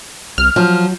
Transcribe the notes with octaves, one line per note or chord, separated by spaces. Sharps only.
C2 F6
F3 F#3